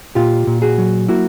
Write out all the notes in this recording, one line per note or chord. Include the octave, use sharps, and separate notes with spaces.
A#2 F4 G4
A#2
F#4 G#4
F#3
A#3 E4 F#4